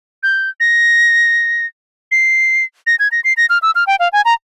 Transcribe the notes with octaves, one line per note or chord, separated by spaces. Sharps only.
G6
A#6
C7
A#6
G#6
A#6
C7
A#6
F6
E6
F6
G5
F5
G#5
A#5